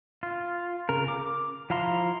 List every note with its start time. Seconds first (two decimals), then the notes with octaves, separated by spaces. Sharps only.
0.23 F4
0.89 C#3 A#4
1.08 D6
1.70 F3 E4 F5 A#5 C6